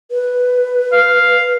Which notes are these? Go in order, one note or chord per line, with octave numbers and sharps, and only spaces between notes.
B4
F5